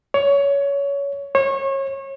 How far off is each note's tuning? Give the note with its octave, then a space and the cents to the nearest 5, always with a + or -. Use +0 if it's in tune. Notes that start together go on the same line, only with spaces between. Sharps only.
C#5 +20
C#5 -30